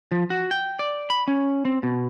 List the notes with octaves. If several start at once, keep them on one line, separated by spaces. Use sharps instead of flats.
F3
F#4
G5
D5
B5
C#4
C4
B2